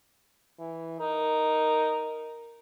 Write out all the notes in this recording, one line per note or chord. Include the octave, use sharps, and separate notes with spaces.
E3
D#4 A#4